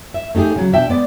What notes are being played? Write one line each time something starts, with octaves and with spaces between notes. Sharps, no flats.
E5
A3 D#4 F4 G4 G#4
C#3 F#3
B2 D4 E5 G5 A5
G#3 B3 D5